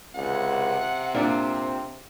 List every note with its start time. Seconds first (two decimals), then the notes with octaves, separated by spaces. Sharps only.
0.15 C#2 C3 F#5
1.14 A#2 C4 D4 F4